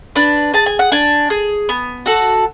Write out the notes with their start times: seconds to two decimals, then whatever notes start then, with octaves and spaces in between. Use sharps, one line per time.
0.16 D4 B4
0.54 G#4 A5
0.66 G#5
0.79 F#5
0.92 D4 G#5
1.30 G#4
1.69 B3
2.06 F#4 A4